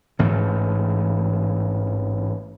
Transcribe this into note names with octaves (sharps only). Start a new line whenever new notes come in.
A1 G#2 E3 A3